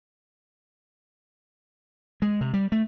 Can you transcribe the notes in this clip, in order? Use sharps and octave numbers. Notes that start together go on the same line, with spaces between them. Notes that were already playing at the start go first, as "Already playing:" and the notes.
G#3
C3
G3
A3